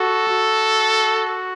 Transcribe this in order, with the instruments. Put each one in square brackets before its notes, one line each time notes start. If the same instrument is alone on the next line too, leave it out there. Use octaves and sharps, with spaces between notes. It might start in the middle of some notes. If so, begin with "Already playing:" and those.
Already playing: [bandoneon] F#4 [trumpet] A4
[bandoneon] F#4